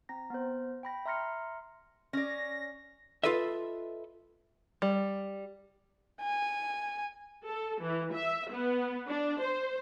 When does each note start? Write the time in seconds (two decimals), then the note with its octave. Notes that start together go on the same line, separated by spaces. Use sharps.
0.09 C4 A#5 A#6
0.30 B3 C5
0.83 G5 B5 A#6
1.06 E5 A#5 C6 F6 A#6 C#7
2.13 C#4 D5 A#6
3.24 F4 A4 B4 D#5 E5
4.82 G3
6.21 G#5
7.46 A4
7.81 E3
8.14 E5
8.51 B3
9.08 D4
9.41 C5